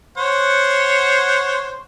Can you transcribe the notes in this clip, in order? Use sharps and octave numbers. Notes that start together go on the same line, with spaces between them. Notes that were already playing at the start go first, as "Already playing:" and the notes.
C5 C#5 F#5